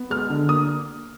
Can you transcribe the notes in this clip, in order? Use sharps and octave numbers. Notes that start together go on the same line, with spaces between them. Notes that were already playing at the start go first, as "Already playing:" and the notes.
Already playing: B3
G#3 F6
D3
A#3 D#6